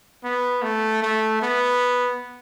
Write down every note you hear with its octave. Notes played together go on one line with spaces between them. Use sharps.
B3
A3
A3
B3